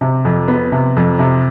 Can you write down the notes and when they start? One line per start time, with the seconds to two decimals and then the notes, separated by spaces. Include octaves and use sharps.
0.01 C3
0.25 F2
0.48 B3
0.72 C3
0.96 F2
1.19 C3